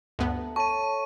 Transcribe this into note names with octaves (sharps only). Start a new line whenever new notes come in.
D2 G2 A3 B3 A#5
A4 C#5 A5 C#6 D#6 D#7